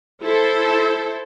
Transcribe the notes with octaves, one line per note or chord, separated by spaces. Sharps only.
E4 A4 C5